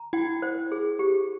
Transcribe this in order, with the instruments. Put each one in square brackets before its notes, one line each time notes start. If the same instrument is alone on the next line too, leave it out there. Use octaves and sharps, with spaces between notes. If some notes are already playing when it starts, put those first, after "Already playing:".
Already playing: [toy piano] A#5
[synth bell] E4 [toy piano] G5
[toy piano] C5
G#4
G4